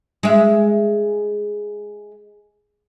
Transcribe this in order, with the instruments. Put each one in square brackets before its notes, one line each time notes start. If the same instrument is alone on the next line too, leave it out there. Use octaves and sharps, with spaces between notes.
[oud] G#3 E5